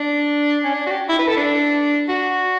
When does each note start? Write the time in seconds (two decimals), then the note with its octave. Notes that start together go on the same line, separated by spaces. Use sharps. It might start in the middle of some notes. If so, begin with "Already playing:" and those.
Already playing: D4
0.64 C#4
0.74 D4
0.86 F#4
0.92 G4
1.09 E4
1.19 B4
1.28 A4
1.37 D4
2.09 F#4